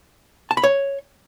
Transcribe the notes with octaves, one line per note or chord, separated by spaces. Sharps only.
A5
B5
C#5